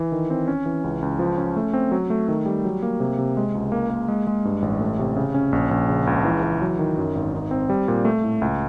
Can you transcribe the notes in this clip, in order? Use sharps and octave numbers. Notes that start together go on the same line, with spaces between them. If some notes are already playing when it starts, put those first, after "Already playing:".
Already playing: E3
D#3
C4
C#4
E3
C#2
C#2
F3
C#4
A3
C4
F#3
A3
D#3
G3
F#3
A#3
C3
C3
G#3
C#2
A#3
A#3
G#3
G#3
G2
A1
A3
C3
C#3
C#4
A#1
A#1
C#3
C#2
E3
E3
F#3
D#3
F#2
G#1
D#4
C4
G3
A#2
A3
A2
C#2